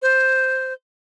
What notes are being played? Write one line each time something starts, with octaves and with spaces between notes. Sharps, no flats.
C5